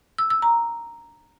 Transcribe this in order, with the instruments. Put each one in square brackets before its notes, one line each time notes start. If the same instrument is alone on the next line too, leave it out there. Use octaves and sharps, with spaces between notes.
[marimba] E6
E6
A#5